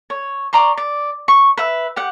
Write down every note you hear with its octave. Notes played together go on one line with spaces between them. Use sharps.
C#5
D5 A#5 C6 C#6
D5
C#6
B4 E5
G4 F#5